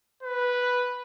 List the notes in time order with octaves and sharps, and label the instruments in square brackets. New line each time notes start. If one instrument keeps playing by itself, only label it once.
[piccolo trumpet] B4